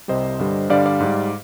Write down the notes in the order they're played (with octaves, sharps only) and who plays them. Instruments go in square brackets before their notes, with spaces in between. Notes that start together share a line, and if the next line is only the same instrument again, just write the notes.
[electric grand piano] C2 C3 G3 C5 D#5
G2 D3 G3
G2 D3 G3 D5 F5
D5 F5
G#2 G3